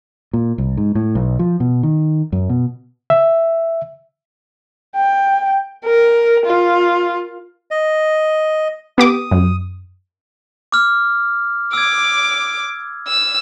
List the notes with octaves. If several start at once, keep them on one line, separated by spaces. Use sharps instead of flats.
A#2
C2
G#2
A2
B1
F3
B2
D#3
F#2
B2
E5
G5
A#4
F4
D#5
B3 G4 D6 D#6
F#2
D6 F6
D6 E6 G#6
E6